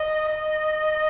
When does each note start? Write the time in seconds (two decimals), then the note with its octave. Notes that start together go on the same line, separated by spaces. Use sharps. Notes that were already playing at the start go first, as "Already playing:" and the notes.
Already playing: D#5
0.31 D#5